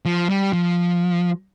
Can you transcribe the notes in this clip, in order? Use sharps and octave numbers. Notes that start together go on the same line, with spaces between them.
F3
G3
F3